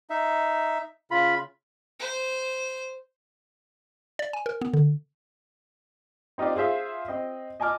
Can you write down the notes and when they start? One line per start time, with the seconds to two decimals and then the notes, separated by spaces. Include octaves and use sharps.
0.10 D#4 E5
1.11 C#3 F4 B5
2.00 C5
4.19 D5
4.33 G#5
4.46 A#4
4.61 B3
4.74 D3
6.38 C4 D#4 F4 G4 D5
6.56 F4 G#4 C5 E5 F5
7.08 C4 D#5
7.60 D#5 G#5 A5 D6 F6